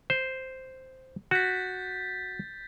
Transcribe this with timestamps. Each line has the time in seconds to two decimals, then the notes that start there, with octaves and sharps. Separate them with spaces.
0.10 C5
1.31 F#4 G6 A6 B6